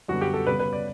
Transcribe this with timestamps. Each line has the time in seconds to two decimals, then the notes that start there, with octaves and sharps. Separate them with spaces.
0.08 F#2 D3 G3 B3 F#4
0.21 G4
0.34 A4
0.47 C#3 G3 B3 B4
0.59 B4
0.73 D5